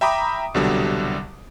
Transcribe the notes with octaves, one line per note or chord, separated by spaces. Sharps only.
E5 G5 A#5 B5 D6 D#6
C2 B2 D3 F#3 G3